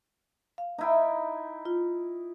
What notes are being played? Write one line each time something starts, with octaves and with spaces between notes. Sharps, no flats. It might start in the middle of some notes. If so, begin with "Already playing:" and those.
F5
D#4 E4 G5
F4